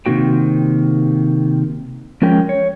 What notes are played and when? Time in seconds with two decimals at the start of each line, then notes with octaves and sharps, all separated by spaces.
0.06 C3 D#3 A#3 F#4 G5
2.22 F3 G#3 C#4 A#4 G5
2.49 C#5